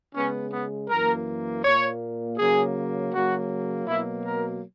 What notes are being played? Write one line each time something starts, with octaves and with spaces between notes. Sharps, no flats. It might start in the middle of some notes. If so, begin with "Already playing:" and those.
C#3 G#3 B3 C#4
B3
F#2 E3 A#3 A#4
A#2 A#3 C#5
C#3 F#3 A#3 G#4
C#3 F#3 A#3 F#4
B2 F#3 A#3 E4
A#4